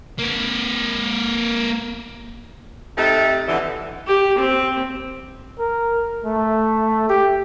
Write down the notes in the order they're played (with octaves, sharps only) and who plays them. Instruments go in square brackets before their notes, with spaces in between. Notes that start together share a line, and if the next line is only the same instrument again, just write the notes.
[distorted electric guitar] A#3 B4
[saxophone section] C3 A3 D#4 A4
B2 D3 E3
[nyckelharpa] G4
C4
[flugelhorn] A#4
A3
G4